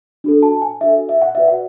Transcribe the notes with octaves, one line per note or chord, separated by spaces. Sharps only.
D4 F#4 A4
A5
G#5
D4 F#4 A4 E5
E5
F#5
F#4 B4 D5 E5
F#5